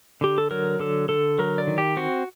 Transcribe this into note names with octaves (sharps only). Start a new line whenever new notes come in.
D3 G4
A4
F#3 A#4
D3 A4
D3 A4
F#3 A#4
D5
D#3
G4
C4 F#4